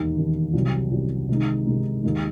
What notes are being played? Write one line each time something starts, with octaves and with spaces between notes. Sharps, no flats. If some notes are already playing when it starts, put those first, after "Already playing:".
Already playing: E1 D#2 D#3
E1 D#2 D#3
C2 C3 F#3
C2 C3 F#3
C3 D#3 G#3 D#4
C3 D#3 G#3 D#4
D#2 D#3 G#3